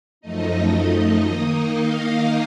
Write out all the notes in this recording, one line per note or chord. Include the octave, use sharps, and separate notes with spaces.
F#2 F3 A3 D#4 D#5
D#3 A#3 D#4 D#5
F5